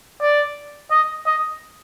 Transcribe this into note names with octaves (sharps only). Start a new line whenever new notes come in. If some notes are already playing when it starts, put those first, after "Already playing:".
D5
D#5
D#5